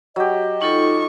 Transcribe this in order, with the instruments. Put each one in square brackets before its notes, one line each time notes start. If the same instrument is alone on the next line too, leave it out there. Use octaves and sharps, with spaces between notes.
[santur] F#3 G4 [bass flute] D#5
[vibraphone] D#4 F4 A4 [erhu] C#6